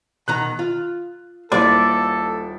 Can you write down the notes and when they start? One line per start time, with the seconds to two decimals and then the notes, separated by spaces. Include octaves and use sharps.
0.28 B2 D#3 A#5 F#6
0.59 F4
1.52 D#1 A#3 E4 A4 C5 D5